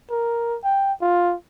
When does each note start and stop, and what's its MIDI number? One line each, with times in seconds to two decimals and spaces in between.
0.10 0.58 70
0.64 0.93 79
1.01 1.34 65